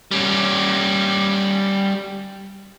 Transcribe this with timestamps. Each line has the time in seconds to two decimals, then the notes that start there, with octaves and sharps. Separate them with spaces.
0.11 G3 C#4